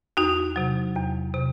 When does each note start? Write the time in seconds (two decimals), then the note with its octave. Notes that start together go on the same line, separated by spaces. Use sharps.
0.17 E2 D#4 F#4
0.56 C3 F#3
0.96 E2
1.34 C3